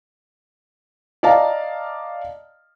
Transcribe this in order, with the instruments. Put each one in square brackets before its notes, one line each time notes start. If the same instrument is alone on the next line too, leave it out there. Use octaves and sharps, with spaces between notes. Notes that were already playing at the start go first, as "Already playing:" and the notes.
[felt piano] D5 D#5 F5 A5 A#5